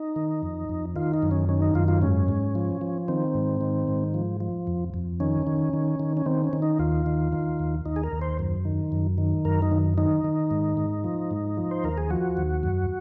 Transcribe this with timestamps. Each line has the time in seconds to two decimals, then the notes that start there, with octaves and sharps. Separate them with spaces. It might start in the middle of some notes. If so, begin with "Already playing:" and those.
Already playing: D#4
0.16 D#3
0.43 F2
0.69 F2
0.96 D#3 F4
1.14 D#4
1.22 F#2
1.31 C#4
1.49 D#3 C#4
1.62 D#4
1.75 F#2 F4
1.88 F4
2.02 G#2 C#4
2.28 G#2
2.55 F3
2.81 F3
3.08 D#3 C4
3.34 G#2
3.61 D#3
3.88 G#2
4.14 F3
4.40 F3
4.67 F2
4.94 F2
5.20 D#3 C#4
5.47 D#3
5.73 D#3
6.00 D#3
6.17 C#4
6.26 D#3 C4
6.44 C#4
6.53 D#3
6.62 D#4
6.79 D#2 F4
7.06 D#3
7.32 D#3
7.59 D#2
7.86 D#2 D#4
7.96 G#4
8.03 A#4
8.12 D#2
8.21 C5
8.39 F#2
8.65 D#3
8.92 F#2
9.18 D#3
9.45 F#2 A#4
9.62 D#4
9.71 D#3
9.98 D#3 D#4
10.24 D#3
10.51 G#2
10.77 G#2
11.04 F3
11.31 G#2
11.57 F3
11.71 C5
11.84 D#2 A#4
11.98 G#4
12.10 F3 F#4
12.37 D#2
12.63 F#2